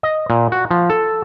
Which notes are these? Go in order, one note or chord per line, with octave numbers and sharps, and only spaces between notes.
D#5
A#2
F#4
F3
A4